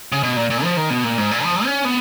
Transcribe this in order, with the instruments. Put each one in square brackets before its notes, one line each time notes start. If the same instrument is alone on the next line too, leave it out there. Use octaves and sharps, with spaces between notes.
[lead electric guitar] C#3
B2
A#2
A#2
F3
D#3
B2
A#2
G#2
A#2
F3
C#4
B3